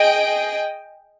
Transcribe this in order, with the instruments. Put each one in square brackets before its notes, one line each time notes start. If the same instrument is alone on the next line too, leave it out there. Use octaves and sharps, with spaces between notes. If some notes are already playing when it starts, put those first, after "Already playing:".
Already playing: [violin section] G#4 D#5 G5